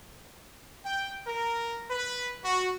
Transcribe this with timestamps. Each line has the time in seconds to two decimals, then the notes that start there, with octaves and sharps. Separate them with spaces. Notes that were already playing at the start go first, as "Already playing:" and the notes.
0.86 G5
1.26 A#4
1.90 B4
2.44 F#4